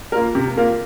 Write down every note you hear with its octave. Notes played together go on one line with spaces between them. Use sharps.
A#3 F4 A#4
C3
A#3 F4 A#4